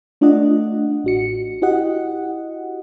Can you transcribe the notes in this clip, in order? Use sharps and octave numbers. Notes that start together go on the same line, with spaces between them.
A3 D4 F4 D5 D#5 F#5
A1 F#4 C#7
E4 F#4 G4 D#5 F#5